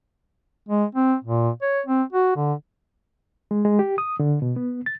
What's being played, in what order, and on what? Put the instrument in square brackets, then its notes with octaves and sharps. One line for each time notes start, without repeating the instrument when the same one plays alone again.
[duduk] G#3
C4
A#2
C#5
C4
F#4
D3
[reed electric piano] G#3
G#3
G4
D#6
D3
B2
B3
A6